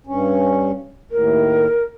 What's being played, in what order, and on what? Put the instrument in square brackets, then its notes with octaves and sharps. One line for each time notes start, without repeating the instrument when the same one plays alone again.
[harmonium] G2 C#4
[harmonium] D#2 A2 [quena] A#4